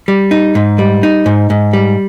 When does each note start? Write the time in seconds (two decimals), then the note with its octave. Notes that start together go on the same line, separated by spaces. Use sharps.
0.08 G3
0.31 D#4
0.55 G#2
0.79 G3
1.03 D#4
1.26 G#2
1.50 G#2
1.73 G3